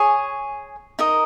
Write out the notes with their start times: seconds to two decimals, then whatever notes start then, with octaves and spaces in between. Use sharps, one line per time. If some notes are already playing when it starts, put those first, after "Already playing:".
Already playing: G#4 C#5 G#5
0.99 D#4 A#4 D#5